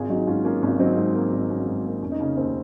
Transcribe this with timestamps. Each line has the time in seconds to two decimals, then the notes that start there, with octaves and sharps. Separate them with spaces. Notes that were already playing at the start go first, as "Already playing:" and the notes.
Already playing: G#1 F4 G#4
0.10 F#3 D#4 F#4
0.27 G#2 C#4 F4
0.45 A#3 C#4 F4
0.63 G#1 C#4
0.79 F#3 C4 D#4
0.97 G#2
1.15 A#3
1.33 G#1
1.50 F#3 C#4
1.67 G#2
1.85 A#3
2.02 F1 C#4
2.12 D#4
2.20 C#3 C#4
2.37 D#2 C4